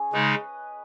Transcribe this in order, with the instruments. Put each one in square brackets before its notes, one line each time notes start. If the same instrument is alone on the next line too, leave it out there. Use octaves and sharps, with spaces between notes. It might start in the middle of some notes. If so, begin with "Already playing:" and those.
Already playing: [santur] C#4 G#4
[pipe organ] C#3 G#3 D#4 [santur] B4 D#5